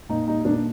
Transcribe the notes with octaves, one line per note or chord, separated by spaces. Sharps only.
A#2 D#4
G3 D#4
A#2 D4